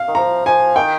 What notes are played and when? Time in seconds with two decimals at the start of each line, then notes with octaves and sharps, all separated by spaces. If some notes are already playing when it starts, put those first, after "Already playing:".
Already playing: F5
0.08 D#3
0.15 F3 A#5
0.46 F3 G#5
0.76 D#3 G5